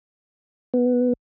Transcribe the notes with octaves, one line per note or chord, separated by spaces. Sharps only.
B3